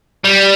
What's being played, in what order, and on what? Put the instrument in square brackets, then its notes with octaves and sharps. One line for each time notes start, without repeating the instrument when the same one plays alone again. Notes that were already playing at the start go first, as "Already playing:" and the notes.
[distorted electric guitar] G3